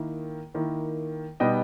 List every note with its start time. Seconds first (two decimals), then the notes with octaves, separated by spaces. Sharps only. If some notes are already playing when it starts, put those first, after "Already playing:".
Already playing: D#3 A#3 E4
0.54 D#3 A#3 E4
1.40 B2 G3 B3 D#4 D#5 G5